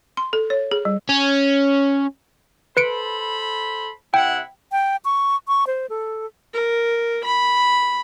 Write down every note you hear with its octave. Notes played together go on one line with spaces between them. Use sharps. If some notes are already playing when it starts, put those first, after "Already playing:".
C6
A4
C#5
G#4
G3
C#4
A4 B4 C5 B5 C#7 D7
C3 E4 F#5 G5
G5
C#6
C#6
C5
A4
A#4
B5